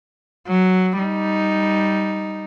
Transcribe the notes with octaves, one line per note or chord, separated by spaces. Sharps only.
F#3
G3 D#4